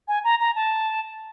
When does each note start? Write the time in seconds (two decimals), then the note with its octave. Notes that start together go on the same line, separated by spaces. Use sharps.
0.08 G#5
0.24 A#5
0.40 A#5
0.56 A5